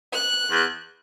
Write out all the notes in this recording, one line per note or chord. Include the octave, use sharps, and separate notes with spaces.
F#6
E2